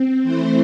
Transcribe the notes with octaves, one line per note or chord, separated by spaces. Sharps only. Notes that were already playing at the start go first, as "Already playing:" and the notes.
Already playing: C4
E3 A3 C4 E4 C5